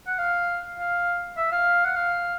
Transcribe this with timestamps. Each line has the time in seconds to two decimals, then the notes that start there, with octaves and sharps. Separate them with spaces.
0.07 F#5
0.18 F5
0.78 F5
1.37 E5
1.52 F5
1.85 F#5
1.96 F5